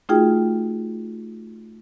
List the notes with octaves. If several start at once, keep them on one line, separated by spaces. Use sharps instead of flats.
A3 D#4 F4 F#4 G#4 G5